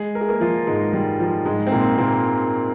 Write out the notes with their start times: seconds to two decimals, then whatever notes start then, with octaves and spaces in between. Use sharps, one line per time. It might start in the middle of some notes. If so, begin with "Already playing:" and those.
Already playing: G#3 G#4
0.15 A#4
0.21 G#4
0.29 A#3 A#4
0.40 F3 F4
0.67 G#2 G#3
0.93 G3
1.20 F3
1.45 G#2 G#3
1.67 C4
1.71 A#2 A#3
1.98 A#2 A#3